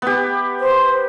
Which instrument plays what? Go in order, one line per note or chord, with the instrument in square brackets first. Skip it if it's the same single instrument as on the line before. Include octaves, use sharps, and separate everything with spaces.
[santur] B3 G4
[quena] C5